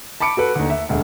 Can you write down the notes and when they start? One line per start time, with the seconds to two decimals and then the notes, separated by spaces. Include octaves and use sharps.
0.20 A5 B5 D6 C#7 D7
0.37 F#4 A4 B4
0.56 D#2 D3
0.70 E5
0.89 E1 D2